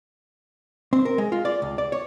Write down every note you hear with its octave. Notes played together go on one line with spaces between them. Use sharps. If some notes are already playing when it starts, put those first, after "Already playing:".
C4
A#4
G#3
F4
D5
C#2
D5
C#5